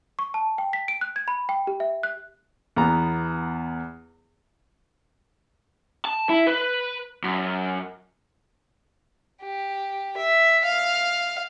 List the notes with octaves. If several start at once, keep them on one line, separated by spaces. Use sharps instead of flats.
C#6
A5
G5
B6
D7
F#6
G#6
B5
G5
G4
E5
F#6
E2 B3 A#5
A5
E4
B4
F#2
G4
E5
F5